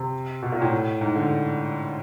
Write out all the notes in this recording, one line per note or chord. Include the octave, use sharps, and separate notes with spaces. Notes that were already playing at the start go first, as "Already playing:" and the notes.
Already playing: C3
B2
A#2
A2
G#2
D3